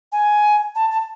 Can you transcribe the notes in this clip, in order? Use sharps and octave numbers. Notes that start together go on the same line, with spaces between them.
G#5
A5
A5